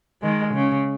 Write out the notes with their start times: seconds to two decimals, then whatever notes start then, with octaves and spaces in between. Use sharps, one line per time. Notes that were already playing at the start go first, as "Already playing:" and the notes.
0.22 D#3 G#3
0.54 C#3